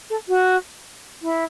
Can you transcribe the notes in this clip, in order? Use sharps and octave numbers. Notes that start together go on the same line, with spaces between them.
A4
F#4
E4